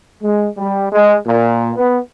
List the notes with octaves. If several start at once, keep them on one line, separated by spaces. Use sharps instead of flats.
G#3
G3
G#3
A#2
B3